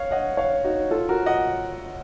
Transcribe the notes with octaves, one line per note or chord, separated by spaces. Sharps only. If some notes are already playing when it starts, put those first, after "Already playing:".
Already playing: C#5 F5
D#5 F#5
C#5 F5
D#4 F#4
F4 A4
F#4 A#4
D#5 F#5